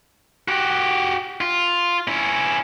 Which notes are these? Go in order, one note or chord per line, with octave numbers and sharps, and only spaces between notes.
F#4 G4
F4
C#4 E4